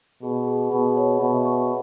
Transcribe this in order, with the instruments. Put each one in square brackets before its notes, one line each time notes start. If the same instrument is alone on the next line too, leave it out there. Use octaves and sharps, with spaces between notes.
[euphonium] B2 [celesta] G#4
[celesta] G#4
[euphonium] B2 [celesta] G#4
[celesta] C#5
[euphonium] B2 [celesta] E5
[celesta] C#6